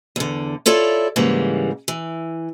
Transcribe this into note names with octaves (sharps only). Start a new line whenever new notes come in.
E2 D3
E4 F4 A4 C#5 D5
G#2 C#3 E3 G3 A#3
E3